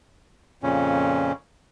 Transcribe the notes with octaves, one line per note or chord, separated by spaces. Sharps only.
F2 A#2 C#3 C#4